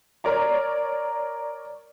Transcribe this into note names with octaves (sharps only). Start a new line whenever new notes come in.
A#4 C#5 D5 A#5